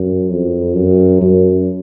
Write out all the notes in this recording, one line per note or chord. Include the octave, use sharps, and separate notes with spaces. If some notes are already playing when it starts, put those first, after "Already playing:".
Already playing: F#2
F2
F#2
F#2